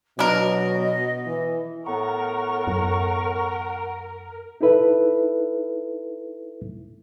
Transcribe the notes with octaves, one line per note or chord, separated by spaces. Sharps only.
B2 F#3 D4 A#4 D#5
E3
A2 B3 A#4 F#5 A#5 C#6
F#2
D#4 E4 A4 B4 E5